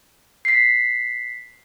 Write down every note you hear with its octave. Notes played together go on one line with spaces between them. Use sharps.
B6 C7